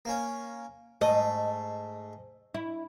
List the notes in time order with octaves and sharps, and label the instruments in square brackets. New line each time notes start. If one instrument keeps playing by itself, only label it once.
[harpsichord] A#3 C#4
[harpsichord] G#2 A3 [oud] D#5
[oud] E4